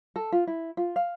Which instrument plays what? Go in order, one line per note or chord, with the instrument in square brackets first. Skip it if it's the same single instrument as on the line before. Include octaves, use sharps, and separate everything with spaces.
[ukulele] A4
F4
E4
F4
F5